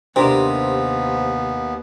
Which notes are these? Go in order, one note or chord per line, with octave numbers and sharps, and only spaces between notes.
D#2 C3 B3 D4 G4 A#4 C5